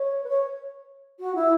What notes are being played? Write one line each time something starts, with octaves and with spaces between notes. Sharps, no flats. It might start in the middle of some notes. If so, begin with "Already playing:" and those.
Already playing: C#5
B4
C#5
F#4
E4